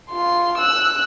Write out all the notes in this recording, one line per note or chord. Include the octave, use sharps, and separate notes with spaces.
F4 C6
E6 F#6